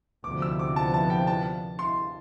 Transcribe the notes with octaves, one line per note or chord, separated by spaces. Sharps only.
D2 C3 F3 B3 D6
E6
D6
A5
A5
G5
A5
C6